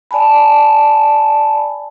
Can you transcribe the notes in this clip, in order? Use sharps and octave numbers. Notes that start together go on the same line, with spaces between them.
D5 G#5 A5 B5